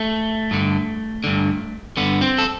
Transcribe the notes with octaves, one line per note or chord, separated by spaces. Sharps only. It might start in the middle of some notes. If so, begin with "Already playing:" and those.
Already playing: A3
G2 D3
G2 D3
G2 D3 B3
C4
A4